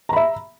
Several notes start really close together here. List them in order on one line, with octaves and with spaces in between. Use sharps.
A#5 B5 E5